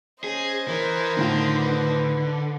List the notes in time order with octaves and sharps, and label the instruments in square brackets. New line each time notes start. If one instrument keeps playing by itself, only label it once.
[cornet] C#4 [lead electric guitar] G#4 [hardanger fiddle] C5 D#5
[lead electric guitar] E3 [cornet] A#4
[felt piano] A2 D#3 F4 [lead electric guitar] D3
[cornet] B4